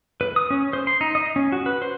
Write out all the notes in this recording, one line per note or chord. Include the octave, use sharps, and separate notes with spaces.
B4
D#6
C#4
C5
C6
D#4
D#5
C#4
F#4
B4
C5